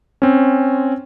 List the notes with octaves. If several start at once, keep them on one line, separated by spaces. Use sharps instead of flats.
C4 C#4